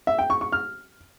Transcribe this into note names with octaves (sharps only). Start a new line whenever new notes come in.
E5
G5
C#6
C#6
F6